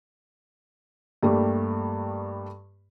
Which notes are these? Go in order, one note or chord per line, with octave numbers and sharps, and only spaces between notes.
G2 G3 A3 A#3